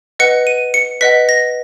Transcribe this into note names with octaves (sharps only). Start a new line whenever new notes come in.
B4 D#5 F#5 C#7
D#7
C#7
B4 D#5 F#5 B6
A#6